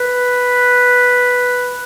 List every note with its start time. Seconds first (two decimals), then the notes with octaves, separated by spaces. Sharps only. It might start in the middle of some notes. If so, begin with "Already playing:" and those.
Already playing: B4